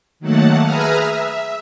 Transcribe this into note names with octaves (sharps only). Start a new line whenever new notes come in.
D#3 F#3 A3 A#3 F#5 A5
G#4 B4 E5 A#5 D#6 F6
E5